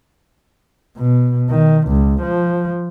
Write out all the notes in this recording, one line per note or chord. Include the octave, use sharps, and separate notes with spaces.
B2
D#3
C#2
F3